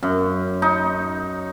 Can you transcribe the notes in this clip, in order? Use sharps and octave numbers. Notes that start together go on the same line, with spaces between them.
F#2
D#4